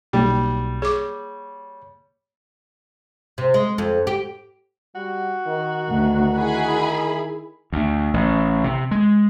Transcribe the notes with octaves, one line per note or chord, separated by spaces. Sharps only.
B1 G3 A#3
G#4 C#5 D6
C3
G#3
F2
G4
G3 F#4
D#3
D2
E4 G#4 B5
D2
A1
C3
G#3